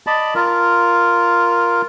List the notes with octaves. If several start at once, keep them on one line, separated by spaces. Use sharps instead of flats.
D5 D#5 A5 B5
F4 A#4